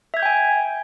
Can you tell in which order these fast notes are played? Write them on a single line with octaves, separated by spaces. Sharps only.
E5 G#6 G6 G5 G#5